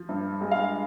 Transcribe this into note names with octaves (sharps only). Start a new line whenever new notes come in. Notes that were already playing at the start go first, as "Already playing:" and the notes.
Already playing: F3
G2
G#3
F5